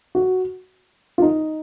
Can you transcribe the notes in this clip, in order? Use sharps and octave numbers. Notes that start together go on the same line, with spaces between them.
F#4
F4
D#4